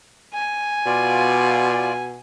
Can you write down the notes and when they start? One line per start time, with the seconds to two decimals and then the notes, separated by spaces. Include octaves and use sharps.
0.34 G#5
0.86 B2 F4 D5